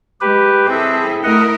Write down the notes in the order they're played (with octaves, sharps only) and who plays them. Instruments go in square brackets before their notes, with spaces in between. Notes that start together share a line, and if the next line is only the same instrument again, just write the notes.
[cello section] G#3 [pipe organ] G4 B4
[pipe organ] C4 [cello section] E4 G#4 A4
[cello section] A3 E4 A#4 [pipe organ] D#5 F#5